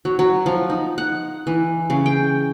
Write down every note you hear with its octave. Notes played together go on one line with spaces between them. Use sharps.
F#3
F#3
F3
D#4
F#5
E3
C#3
G5